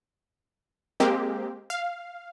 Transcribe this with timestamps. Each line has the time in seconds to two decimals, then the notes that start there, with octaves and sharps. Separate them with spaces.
1.00 G#3 A#3 C4 G4
1.70 F5